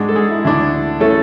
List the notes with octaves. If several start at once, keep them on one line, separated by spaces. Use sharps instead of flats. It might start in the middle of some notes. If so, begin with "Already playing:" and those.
Already playing: G#2 G#3 D4 F#4
A4
G#3 G#4
E4
D2 D3 A3 D4 E4
E3 A3 C#4 A4